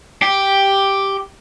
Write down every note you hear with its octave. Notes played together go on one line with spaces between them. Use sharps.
G4